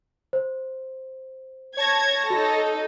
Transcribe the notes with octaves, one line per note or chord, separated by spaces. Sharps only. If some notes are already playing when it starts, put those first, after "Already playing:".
C5
C#5 A5 G#6 A#6
D#4 F#4 A4